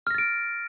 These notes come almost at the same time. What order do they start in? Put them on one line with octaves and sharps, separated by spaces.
F6 A#6 A6 D7